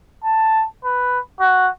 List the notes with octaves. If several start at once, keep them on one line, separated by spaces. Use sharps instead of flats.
A5
B4
F#4